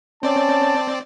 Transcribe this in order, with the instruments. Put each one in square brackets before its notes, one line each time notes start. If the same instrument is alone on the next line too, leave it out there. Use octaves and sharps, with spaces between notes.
[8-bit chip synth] C4 D5 [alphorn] C#4 [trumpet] A5